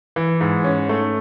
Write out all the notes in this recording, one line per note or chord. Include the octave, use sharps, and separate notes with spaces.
E3
G#2
C#4
A3